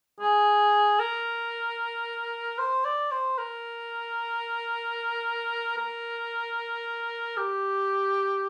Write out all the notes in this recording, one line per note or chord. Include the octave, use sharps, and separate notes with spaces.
G#4
A#4
C5
D5
C5
A#4
A#4
G4